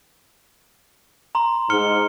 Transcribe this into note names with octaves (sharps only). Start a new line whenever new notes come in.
A#5 C6
G#2 F6 C#7 G7